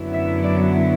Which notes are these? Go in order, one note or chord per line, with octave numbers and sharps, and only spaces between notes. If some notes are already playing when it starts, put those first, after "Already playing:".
Already playing: F#2 D3 F#3 B3 E4
E5
D5